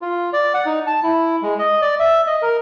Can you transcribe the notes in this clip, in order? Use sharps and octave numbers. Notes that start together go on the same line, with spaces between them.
F4
D5
F#5
D#4
A5
E4
G#3
D#5
D5
E5
D#5
A#4